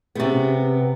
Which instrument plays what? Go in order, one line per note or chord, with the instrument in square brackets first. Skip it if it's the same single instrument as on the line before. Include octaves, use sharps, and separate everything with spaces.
[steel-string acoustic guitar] C3 B3 [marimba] C#4 G4 G#4